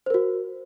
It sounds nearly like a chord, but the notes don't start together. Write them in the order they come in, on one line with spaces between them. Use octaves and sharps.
C5 A#4 F#4